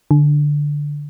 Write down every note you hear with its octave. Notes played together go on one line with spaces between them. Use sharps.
D3